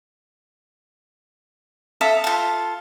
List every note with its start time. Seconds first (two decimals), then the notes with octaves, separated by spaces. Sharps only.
2.01 A4 E5 F5 D#6
2.24 F4 A4